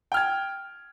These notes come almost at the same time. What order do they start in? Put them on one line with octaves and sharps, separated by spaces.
G5 F6 G#6